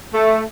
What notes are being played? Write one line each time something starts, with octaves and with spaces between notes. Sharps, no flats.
A3